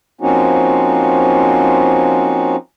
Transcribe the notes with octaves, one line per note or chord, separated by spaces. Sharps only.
F3 A#3 C4 C#4 D#4 F#4